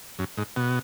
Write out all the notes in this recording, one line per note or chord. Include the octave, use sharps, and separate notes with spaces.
F#2
G#2
B2